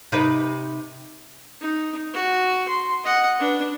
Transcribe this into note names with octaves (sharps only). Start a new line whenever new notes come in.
C3 D#4 B4
D#4
F#4
C6
D#5 F#5
D4 B4